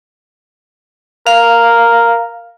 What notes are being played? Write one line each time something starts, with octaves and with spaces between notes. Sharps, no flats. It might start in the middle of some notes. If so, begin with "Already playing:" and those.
A#4 F5